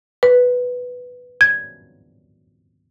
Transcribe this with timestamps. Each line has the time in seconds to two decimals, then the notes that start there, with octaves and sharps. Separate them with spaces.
0.23 B4
1.41 G#6